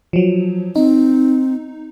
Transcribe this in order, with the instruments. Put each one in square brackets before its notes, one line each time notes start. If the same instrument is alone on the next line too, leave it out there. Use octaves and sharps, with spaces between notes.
[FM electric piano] F3 F#3
[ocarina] C4 [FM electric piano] D#4